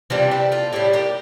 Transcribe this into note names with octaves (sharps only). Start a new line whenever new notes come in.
C3 E3 G3 D4 F4
E4 G4
F4 A4
A2 G3 E4 G4
G4 A#4